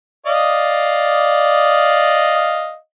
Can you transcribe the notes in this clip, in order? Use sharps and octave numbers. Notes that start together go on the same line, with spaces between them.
D5 D#5 F5